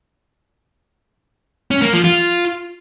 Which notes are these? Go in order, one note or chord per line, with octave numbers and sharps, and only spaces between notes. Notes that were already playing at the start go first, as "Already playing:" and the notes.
C#4
A#3
F3
F4